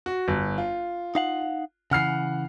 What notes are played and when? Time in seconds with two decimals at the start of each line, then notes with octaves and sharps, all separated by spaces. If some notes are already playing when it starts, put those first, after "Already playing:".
0.06 F#4
0.28 G1
0.58 F4
1.15 D#4 F5 F#5
1.91 C#3 E3 F#5 F6 C7